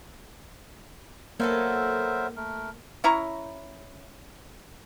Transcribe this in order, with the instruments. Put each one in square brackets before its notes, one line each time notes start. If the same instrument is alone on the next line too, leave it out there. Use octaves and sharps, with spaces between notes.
[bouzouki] F#3 B3 A4 [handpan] A#3 [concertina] A#4 C5 E5
[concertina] A3 A#4
[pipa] C#4 E4 A#5 C#6